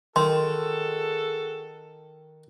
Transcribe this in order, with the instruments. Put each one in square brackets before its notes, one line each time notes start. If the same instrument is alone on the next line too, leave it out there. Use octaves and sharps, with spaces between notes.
[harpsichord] D#3 [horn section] F#4 G#4 A4 [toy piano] C6